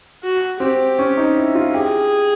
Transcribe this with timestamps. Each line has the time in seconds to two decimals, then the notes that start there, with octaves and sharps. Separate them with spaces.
0.23 F#4
0.60 C4 G4
0.99 C#4
1.17 D#4
1.36 E4
1.55 F4
1.74 G4 G#4